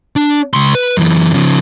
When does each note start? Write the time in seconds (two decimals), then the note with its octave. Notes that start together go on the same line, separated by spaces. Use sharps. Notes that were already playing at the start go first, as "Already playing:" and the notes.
0.16 D4
0.53 C#2 C6
0.75 B4
0.97 F#2 E3
1.34 C#3 F3